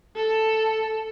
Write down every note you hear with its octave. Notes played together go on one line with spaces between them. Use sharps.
A4